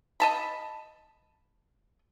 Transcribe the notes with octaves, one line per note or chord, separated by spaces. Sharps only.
D#5 A5 B5